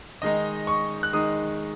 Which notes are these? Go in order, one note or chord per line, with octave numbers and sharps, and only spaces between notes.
D#3 G#3 D#4 D#5
C#6
F#6
D#3 G#3 D#4 D#6